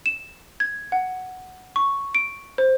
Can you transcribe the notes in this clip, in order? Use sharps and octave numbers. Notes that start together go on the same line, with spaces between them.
E7
G#6
F#5
C#6
D7
C5